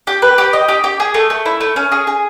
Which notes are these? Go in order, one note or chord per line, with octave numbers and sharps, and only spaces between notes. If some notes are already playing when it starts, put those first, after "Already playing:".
G4
B4
G4
D#5
G4
G4
G#4
A3
A3
E4
A3
C#4
G#4
G#4